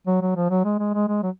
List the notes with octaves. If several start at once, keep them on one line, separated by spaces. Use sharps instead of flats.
F#3
F#3
F3
F#3
G#3
G#3
G#3
G#3
F#3